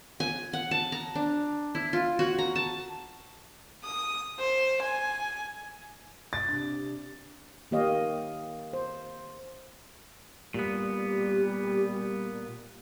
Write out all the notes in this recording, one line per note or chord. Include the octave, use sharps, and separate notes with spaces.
G#5
F#5
A5
A#5
D4
E4
F4
F#4
A#5
A5
D#6
C5
G#5
A6
C3 D4
D#3 A#3 G4 C#5 D#5 F5
C5
A#2 G3 B3 G4